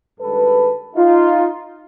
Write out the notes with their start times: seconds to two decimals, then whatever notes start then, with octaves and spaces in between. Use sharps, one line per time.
0.20 G2 D#3 G#3 A4 B4
0.95 D#4 F4